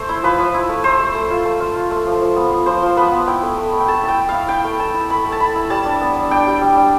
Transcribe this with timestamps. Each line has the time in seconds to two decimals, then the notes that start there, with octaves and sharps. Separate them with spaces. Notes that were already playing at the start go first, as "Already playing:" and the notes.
Already playing: A3 C5
0.09 E4
0.23 F3 B4
0.39 F3
0.54 E4
0.69 A3
0.84 A3 C5
0.99 A3
1.15 A3
1.30 F4
1.45 A3
1.60 F4
1.76 F4
1.91 A3
2.06 F3
2.21 F3
2.36 B3
2.51 F4
2.66 F3 C5
2.82 F3
2.97 B3 B4
3.12 B3
3.27 E4 G5
3.43 A3
3.57 A3
3.73 A3
3.80 G5
3.88 A3 A5
4.03 E4
4.08 G5
4.19 E4
4.29 F5
4.34 E4
4.49 E4 G5
4.64 A3
4.79 E4 A5
4.94 E4
5.10 A3 B5
5.25 A3
5.32 A5
5.40 E4 B5
5.56 E4
5.70 G3 A5
5.85 D4
6.01 B3
6.16 D4
6.31 D4 G5
6.47 G3
6.62 G3
6.77 D4